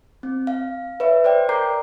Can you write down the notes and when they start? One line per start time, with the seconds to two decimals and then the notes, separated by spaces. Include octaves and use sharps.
0.23 C4
0.47 F5
1.00 B4 C#5 E5
1.24 C5 D5 G5
1.49 A#4 A#5 D6 G6 C7